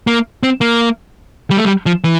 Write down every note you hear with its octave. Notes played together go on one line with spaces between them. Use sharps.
A#3
C4
A#3
G3
A3
G3
F3
E3